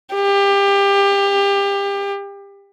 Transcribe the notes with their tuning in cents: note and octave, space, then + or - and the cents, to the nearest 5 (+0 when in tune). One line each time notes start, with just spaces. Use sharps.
G4 +25